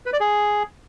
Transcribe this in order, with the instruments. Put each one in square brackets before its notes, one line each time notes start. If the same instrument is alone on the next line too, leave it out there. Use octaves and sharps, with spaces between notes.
[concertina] B4
D5
G#4